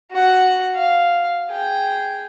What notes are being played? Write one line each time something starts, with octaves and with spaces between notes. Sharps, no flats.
F#4 F#5
F5
G#4 G5